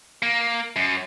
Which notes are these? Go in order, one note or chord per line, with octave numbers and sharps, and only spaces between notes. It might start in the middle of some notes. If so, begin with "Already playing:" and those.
A#3
F#2